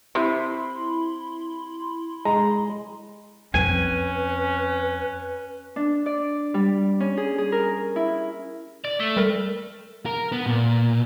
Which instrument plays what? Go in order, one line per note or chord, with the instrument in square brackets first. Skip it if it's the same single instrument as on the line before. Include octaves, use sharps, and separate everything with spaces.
[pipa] C3 [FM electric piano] E4 B5 C6
[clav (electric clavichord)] G#3 [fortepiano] A#5
[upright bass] F2 C4 [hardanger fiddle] C#4 [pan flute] B4 [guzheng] G#5
[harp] D4
D5
G3
C#4
G#4
G#4
A#4
E4
[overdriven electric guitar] D5
A3
[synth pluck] G3 A4 A#4
[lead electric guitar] A#4
B3
A#2